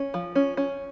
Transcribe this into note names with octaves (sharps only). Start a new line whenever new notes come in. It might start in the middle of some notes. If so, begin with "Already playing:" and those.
Already playing: C#4
F3
C#4
C#4